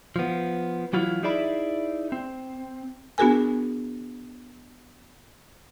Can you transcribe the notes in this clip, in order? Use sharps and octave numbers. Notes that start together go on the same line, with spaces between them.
F3 B3
E3 F#3 E4 F4
D#4 E4 G#4 D5 E5 B5
C4
B3 D4 F#4 G#4 A#4 G#5